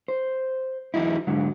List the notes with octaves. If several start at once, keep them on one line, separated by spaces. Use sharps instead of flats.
C5
E2 G#2 F#3 D#4 E4
G#2 D3 F#3